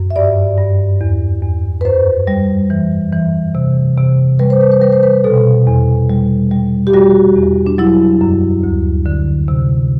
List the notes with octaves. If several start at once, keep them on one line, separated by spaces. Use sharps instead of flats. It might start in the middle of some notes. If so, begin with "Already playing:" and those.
Already playing: F#2
E5
G2 D5
G2
E2
E2
B4
F#2 C5
G3
E3
E3
C3
C3
G3 B4
C5
B4
C5
G3 B4
C5
B4
B2 A4
E2
G3
G3
G4
G3 F#4
E2
D4
F#3 E4
F#2
D2
D3
C3